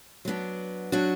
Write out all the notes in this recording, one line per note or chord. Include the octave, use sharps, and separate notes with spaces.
F#3 B3 D4
F#3 D4 F#4